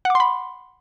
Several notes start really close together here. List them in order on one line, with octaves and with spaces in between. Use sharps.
F#5 D6 C6 B5